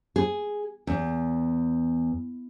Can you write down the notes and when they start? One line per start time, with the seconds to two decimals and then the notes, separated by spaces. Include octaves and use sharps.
0.16 G#4
0.87 E2